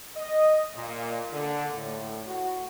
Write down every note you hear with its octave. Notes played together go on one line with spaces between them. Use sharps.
D#5
A#2
D3
A2
F#4